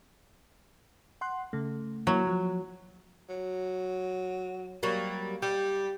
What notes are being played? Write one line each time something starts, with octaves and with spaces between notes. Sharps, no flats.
F#5 C6 F#6
C#3 A3
F#3 A#3 E4
F3
F#3
F#3 G3 A#3
G3 G4